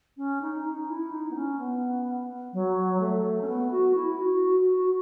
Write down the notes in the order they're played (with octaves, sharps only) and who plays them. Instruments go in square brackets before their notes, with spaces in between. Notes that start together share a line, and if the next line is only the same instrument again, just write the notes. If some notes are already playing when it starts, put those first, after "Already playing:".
[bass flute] C#4
D#4
D#4
E4
D#4
B3
C#4
B3
F#3
A3
C#4
B3
F#4
E4
F#4
F#4
F#4